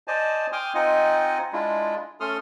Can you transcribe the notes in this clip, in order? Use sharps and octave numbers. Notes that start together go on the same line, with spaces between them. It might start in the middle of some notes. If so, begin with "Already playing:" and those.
C5 D5 D#5 G#5 A5
G5 G#5 C6 D6 D#6 F6
C4 D#4 F4 D#5 F#5 G#5
G#3 D4 E4 F4
A3 C#4 A4 C6 D#6 F6